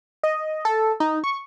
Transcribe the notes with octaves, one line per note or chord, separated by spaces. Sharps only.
D#5
A4
D#4
C#6